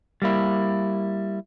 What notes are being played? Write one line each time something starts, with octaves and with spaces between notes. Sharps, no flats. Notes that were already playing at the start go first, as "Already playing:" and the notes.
G3 A#3 E4